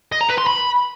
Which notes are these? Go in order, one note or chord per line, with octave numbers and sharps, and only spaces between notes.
D#5
A#5
B4
C6
B5